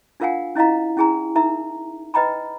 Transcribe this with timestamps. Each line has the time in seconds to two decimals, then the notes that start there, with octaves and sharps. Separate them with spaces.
0.20 D4 F4 A#4 F5 F#5 G#5
0.56 C#4 E4 D#5 F5 A#5
0.97 C#4 E4 G#4 G#5 A#5
1.35 D#4 A#4 E5 A#5
2.14 B4 D#5 G5 A#5 B5